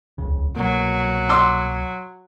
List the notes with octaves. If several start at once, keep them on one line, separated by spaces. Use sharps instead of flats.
D#1 C#2 C#3
C2 B2 F#3 A#3
C6 D6 E6